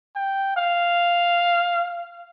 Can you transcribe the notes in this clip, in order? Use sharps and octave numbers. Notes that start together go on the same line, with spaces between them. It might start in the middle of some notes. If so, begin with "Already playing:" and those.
G5
F5